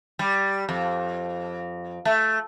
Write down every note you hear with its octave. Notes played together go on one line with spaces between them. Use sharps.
G3
F2
A3